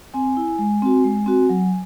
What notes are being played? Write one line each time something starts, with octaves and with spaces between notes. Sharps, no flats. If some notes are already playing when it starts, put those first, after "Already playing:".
C4 G#5
E4
G#3
C4 F#4
G#3
C4 F#4
F#3